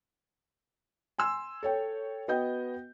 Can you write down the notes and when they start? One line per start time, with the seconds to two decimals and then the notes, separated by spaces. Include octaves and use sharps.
1.18 G#5 C6 E6
1.63 A4 C#5 G5
2.28 B3 F#4 D#5 G5 G6